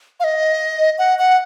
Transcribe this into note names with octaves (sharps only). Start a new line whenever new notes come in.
F5
D#5
F#5
F#5